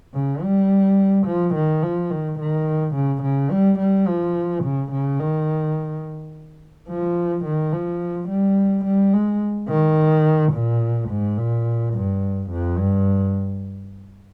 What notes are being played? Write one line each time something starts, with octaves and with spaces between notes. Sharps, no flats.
C#3
G3
F3
D#3
F3
D#3
D#3
C#3
C#3
G3
G3
F3
C#3
C#3
D#3
F3
D#3
F3
G3
G3
G#3
D#3
A#2
G#2
A#2
G2
F2
G2